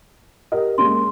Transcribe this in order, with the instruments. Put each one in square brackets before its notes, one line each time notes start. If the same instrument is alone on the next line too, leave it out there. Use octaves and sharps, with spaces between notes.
[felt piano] G4 A#4 D#5
[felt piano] G#3 A#3 C#4 [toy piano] C6